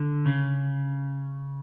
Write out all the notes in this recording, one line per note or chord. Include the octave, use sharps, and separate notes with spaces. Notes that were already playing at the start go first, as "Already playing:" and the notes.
Already playing: D3
C#3